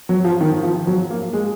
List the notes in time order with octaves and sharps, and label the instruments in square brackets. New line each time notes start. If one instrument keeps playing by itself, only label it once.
[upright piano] F#3
F3
D#3
F3
F#3
A#3
G#3